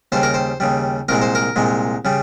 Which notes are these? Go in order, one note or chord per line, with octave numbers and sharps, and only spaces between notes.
D#2 C#3 G3 C5
A#4
C5
D#2 C#3 G3
C2 A#2 G#3 A#4
C5
A#4
C2 A#2 G#3
C#3 G3